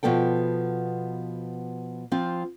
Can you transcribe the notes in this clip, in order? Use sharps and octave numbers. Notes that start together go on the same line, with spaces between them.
B2 F3 B3 A4 G5
F3 C4 F4